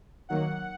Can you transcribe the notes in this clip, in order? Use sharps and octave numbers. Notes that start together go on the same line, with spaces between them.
D#3 F#3 A#3 F#5